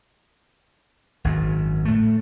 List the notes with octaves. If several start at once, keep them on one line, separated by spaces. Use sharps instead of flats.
G#1 F#2
A2 A3